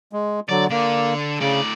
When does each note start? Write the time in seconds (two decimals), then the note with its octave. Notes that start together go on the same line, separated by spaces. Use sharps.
0.13 G#3
0.49 D3 F#3 D5
0.71 D3 A#3 D5
1.40 A2 C#3 D5